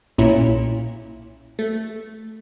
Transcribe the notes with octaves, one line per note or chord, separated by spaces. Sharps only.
B1 A#2 C#4 E4
A3